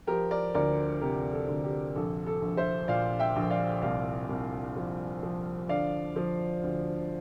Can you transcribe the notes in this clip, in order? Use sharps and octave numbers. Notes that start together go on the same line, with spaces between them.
F3 G4 A#4
A#4 D5
D2 A#4 D5
C3 G4 A#4
A4
D2
G4
A#1 A4
A4
A#1
C5 E5
A#2 D5 F5
E5 G5
A#1
D5 F5
C2 D5 F5
C2
F3
F3
D3 D5 F5
F3
D2